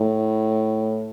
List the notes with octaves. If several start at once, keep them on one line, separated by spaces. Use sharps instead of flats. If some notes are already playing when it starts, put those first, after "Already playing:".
Already playing: A2